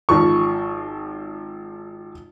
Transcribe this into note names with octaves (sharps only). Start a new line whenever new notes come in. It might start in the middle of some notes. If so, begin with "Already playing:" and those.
G#1 F3 C#6